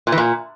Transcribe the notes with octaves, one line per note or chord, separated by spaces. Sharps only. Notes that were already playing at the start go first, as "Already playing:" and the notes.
A#2
E3
A#2